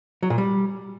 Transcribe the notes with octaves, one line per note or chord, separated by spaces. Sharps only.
F#3
A#2
G3